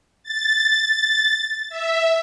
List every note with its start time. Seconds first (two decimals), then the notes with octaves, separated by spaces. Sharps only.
0.23 A6
1.69 E5